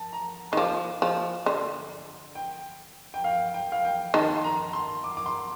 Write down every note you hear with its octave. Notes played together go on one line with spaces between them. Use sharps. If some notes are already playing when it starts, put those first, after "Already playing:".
Already playing: A5
A#5
D#3 C6
F3 D6
F3
D3 C6
G5
G5
F5
G5
F5
G5
D#3 A5
C6
A#5
C6
D6
D6
C6